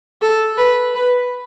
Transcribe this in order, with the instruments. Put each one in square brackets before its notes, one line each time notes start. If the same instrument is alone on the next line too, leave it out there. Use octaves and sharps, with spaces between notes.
[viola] A4
B4
B4